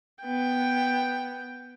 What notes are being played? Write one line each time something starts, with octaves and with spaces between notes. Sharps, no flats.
B3 G5